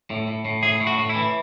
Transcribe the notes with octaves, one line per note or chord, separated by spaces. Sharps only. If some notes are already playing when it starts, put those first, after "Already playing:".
A2
A2
A2
A2 G#4
A2
F#4
A2
E4
E3